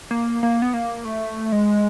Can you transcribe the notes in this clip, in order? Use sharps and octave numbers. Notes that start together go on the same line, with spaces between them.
A#3
A#3
B3
A#3
A3
G#3